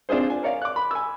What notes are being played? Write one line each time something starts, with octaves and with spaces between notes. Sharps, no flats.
C4 D4 F4 G#4 C5
G#5
A#4 C#5 D5 F5
D6 F#6
B5
G#5 E6